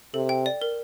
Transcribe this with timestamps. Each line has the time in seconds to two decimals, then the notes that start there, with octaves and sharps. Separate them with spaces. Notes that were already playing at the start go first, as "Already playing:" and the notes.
0.14 C3 A4
0.29 G5
0.46 D5
0.62 A#4